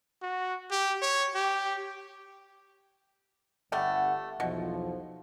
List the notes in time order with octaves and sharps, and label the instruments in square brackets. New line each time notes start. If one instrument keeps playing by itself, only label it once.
[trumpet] F#4
G4
C#5
G4
[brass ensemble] G1 F#5 [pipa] G3 A3
[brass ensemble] B1 E2 F3 [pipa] B2